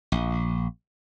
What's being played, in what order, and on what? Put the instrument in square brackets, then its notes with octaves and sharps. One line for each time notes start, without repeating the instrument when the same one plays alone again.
[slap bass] A#1